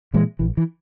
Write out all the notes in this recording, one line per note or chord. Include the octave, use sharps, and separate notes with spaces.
A#2 E3 G#3
A#1 E3
E3